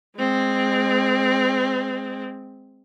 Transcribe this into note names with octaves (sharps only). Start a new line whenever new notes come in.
G#3 C4